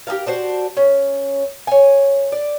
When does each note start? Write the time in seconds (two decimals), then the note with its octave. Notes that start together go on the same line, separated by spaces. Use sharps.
0.07 G4 G#4 A#4 F5
0.26 D4 F#4 C5
0.77 C#4
1.67 C#5 G#5
2.32 D5